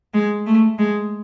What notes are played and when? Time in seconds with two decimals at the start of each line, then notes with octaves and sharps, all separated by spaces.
0.14 G#3
0.47 A3
0.79 G#3